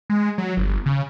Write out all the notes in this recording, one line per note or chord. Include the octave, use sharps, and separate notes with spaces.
G#3
F#3
G1
C#3